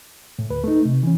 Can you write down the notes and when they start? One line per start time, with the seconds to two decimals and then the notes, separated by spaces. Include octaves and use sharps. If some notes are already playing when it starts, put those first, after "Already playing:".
0.39 A2
0.50 D2 B4
0.64 A3 D#4
0.85 C3
1.03 E3 C#4